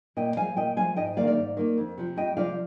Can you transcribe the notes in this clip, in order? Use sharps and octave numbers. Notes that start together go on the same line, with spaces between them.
A#2 D#5 G5
F3 G#3 F5 G#5
A#2 D#5 G5
F3 G#3 F5 G#5
G#2 D#5 G5
D#3 A#3 D5 F5
D5 F5
G#2
D#3 A#3
F2
C3 F3
F2 D#5 G5
C3 F3 D5 F5